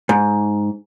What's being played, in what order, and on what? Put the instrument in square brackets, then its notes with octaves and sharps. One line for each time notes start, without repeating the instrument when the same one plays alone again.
[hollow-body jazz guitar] G#2